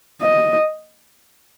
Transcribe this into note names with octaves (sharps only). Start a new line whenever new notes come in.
D#5